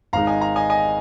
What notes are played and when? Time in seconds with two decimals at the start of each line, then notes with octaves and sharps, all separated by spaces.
0.13 G#1 G#2 G#3 D#4 F5 A#5
0.27 D#5 G#5
0.41 F5 A#5
0.56 D#5 G#5
0.70 D#5 G#5